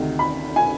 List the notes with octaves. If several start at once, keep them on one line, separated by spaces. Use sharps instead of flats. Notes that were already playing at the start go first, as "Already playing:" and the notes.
Already playing: D2 C3 D#3
B5
G#5